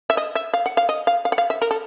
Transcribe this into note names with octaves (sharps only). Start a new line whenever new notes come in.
E5
D#5
E5
F5
F#5
F5
D#5
F5
F5
F#5
F5
E5
A#4
A4